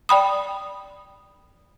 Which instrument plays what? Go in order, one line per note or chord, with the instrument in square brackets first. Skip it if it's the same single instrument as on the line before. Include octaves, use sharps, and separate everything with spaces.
[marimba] D5 G5 B5 D#6